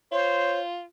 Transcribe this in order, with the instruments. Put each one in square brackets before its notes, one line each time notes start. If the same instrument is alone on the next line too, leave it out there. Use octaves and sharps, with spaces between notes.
[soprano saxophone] F4 [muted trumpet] C5 [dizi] C#5